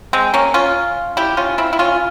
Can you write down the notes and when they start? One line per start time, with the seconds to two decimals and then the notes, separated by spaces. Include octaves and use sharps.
0.13 G#3 C4
0.34 A#3 C#4
0.54 C#4 F4
1.17 E4 G4
1.37 C#4 F4
1.58 C4 E4
1.73 E4
1.79 C#4 F4